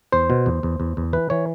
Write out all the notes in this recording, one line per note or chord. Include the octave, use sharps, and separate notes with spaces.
E2 C5
B2
E2
E2
E2
E2
E3 B4
E3 C#5